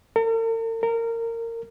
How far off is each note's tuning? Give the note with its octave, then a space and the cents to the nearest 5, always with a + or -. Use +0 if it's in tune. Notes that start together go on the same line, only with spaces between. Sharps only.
A#4 -45
A#4 -20